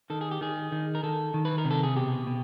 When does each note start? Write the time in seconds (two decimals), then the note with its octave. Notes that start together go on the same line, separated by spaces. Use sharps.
0.10 D#3 A4
0.21 G#4
0.31 G4
0.41 D#3 G#4
0.72 D#3
0.95 A#4
1.03 D#3 A4
1.34 D#3
1.45 B4
1.58 A#4
1.65 C3
1.71 A4
1.83 G#4
1.96 B2 G4
2.27 B2